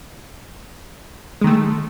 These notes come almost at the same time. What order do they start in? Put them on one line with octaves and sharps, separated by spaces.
G#3 D#3 A3